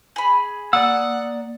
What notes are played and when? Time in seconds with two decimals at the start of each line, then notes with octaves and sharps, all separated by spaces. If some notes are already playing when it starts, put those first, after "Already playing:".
0.16 G#4 B5
0.73 A#3 D5 F#5 D#6 E6